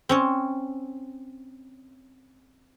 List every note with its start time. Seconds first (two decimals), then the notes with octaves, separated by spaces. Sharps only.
0.09 C4 C#4 C#5